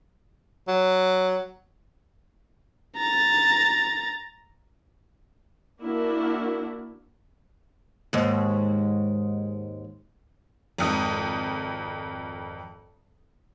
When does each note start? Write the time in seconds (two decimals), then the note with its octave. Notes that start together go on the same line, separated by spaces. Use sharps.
0.68 F#3
2.98 A#5 A6
5.81 A#3 D4 E4 F#4
8.13 D#2 G#2
10.78 G#1 F2 D#6